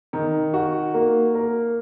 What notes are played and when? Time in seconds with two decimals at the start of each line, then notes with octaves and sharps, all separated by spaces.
0.13 D#3
0.54 F#4
0.94 A#3
1.35 A#4